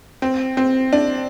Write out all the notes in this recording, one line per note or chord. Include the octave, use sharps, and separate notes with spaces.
C4
C4
D4